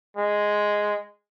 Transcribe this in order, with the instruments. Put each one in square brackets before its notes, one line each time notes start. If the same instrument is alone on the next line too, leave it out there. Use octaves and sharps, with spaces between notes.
[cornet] G#3